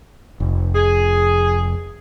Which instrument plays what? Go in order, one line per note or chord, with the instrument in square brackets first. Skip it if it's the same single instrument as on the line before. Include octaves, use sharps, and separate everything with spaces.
[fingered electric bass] F1
[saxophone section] G#4